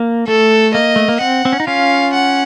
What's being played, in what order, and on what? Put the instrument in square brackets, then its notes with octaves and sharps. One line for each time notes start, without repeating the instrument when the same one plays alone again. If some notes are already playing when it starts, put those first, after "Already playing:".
Already playing: [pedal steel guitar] A#3
[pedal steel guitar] A3 [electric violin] A4
[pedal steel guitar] A#3 [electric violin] D#5
[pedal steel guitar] A3
A#3
[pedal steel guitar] C4 [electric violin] F#5
[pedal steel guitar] C4
C#4
D#4
[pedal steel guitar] C#4 F4 [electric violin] F5
[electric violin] F#5